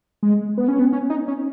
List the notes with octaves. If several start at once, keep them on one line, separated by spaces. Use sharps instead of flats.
G#3
B3
C#4
B3
C#4
D#4
C#4